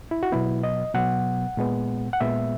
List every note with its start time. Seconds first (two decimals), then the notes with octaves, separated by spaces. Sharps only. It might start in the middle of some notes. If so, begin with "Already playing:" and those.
0.11 E4
0.23 F#4
0.32 B2 F#3 B3 E4
0.63 D#5
0.94 B2 F#3 B3 F#5
1.57 A#2 G#3 B3
2.13 F#5
2.20 A#2 G#3 B3 E5